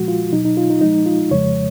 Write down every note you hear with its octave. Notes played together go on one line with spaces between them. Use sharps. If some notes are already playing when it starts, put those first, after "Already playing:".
Already playing: A#2 F3 G#3 F#4
F4
B2 F#3 D#4
D#4
F4
D#4
A#2 F3 G#3 D#4
F4
F2 C#3 F3 G#3 C#5